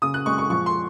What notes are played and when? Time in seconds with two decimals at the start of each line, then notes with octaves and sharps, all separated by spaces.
0.02 C#3 D#6
0.14 F#6
0.26 G#3 C#6
0.38 C#6
0.50 F3 C#6
0.66 C6